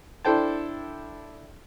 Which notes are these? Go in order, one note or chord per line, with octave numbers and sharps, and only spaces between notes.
D4 E4 A4 C5 G5 A5